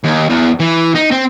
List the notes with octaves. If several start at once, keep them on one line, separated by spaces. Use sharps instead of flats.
D#2
E2
E3
D#4
C4